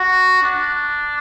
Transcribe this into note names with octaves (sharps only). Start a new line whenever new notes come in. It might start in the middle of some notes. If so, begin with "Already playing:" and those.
Already playing: F#4
D4